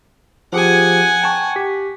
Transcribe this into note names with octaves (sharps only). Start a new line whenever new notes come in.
F3 G4 G#4 F#5 G#5
G5 A5 C#6
G4 B6